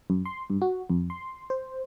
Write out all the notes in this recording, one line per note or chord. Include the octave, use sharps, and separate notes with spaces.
F#2
C6
G2
F#4
F2
C6
C5